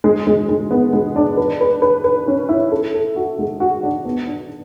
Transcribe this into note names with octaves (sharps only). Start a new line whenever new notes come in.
G#3
G#3
G#3
B3
G#3
D4
B4
B4
B4
B4
C#4
E4
A4
A4
F#4
G#3
F#4
D4
B3
D4